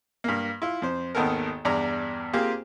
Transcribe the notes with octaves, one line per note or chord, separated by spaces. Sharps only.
G2 A#3
E4 F4
F2 C5
G#1 D#2 D#3 B3 A4 A#4
E2 G2 D4 D5 A#5
A#3 C4 F4 G4 G#4 C5